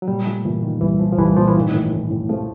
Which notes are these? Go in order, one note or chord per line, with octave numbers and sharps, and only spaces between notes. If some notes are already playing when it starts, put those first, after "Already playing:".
F#3
A#2 G3
F3 A3
A#2 E3
D#3 F3
C2 E3
A#2 F3
F3
C2 E3
A#2 F3
E3
A2 D#3
A2 E3
A2
A2
F3 A3